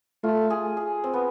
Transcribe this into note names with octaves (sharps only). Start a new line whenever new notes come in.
A3 F4
G#4
G#4
C4
B3